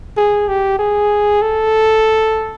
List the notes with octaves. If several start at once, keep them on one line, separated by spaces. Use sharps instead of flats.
G#4
G4
G#4
A4